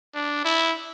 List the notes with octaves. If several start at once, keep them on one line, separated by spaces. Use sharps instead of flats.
D4
E4